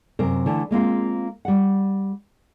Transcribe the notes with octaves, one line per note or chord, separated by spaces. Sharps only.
F#2 C3 A#4 C5
D3 E3 A3
G#3 A#3 C4 F4
G3 F#5